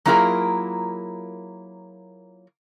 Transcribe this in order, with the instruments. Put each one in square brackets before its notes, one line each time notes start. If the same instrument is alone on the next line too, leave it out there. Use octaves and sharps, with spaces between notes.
[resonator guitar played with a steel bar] F#3 A#3 E4 F4 G#4 A#4